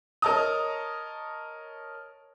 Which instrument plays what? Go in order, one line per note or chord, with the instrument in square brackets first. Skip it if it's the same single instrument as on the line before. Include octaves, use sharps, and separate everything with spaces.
[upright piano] A#4 C#5 D#5 A5 A#5 D#6